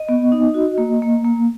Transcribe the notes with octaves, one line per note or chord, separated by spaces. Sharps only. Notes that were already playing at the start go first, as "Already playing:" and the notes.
Already playing: D#5
B3
D#4
F#4
A#3
A#3
A#3